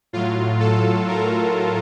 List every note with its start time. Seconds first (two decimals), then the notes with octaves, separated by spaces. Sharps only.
0.13 A2 F#3 F4
0.60 A4
1.08 A#4